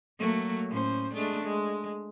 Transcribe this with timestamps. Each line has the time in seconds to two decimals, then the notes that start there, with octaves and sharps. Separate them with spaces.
0.19 F#3 A3 A#3
0.69 A2 C#4 C5
1.14 G#3 A3 D4
1.43 G#3